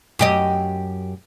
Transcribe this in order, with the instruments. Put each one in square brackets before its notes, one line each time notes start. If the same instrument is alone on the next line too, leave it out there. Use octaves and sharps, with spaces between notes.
[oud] F#2 G4 D#5